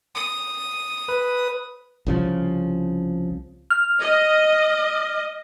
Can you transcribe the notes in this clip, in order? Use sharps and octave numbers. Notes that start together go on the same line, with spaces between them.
D#6
B4
C2 C#3 F3
F6
D#5